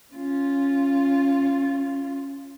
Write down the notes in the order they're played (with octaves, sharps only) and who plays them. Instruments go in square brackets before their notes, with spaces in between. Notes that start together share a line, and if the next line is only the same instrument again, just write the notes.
[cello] C#4 F4